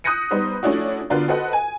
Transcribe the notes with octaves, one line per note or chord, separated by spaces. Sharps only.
D#6 F#6 G6 A#6 C#7 D#7
G3 B3 D#4 B4 C5
F3 A3 C#4 D4 E4 F#4
D3 B3 D4 F4 F#4 A#4
F#4 A4 B4 C5 D#5 F#5
G#5